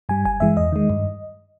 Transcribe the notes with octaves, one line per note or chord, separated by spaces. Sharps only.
G2 G3 G#5
G1 G#5
G2 E3 G#3 E5
E2 D#5
D#3 G#3
G2